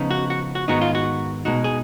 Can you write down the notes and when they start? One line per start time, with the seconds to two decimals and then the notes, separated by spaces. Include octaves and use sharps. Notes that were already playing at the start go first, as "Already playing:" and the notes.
Already playing: C#3 F3 B3 D#4
0.11 F#4
0.30 F#4
0.55 F#4
0.68 G#2 D#3 G#3 B3 D#4 F#4
0.81 F4
0.95 F#4
1.45 B2 G#3 D#4 F#4
1.64 G#4